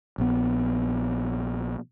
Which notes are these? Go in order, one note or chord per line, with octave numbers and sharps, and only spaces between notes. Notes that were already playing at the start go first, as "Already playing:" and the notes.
A#1 B3